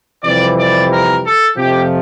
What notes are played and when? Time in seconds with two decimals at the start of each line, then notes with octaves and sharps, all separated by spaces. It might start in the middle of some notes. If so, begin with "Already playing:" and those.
0.23 F2 C3 E3 G3 D5
0.57 D5
0.90 A#4
1.23 A4
1.57 F2 C3 F3 A3 G4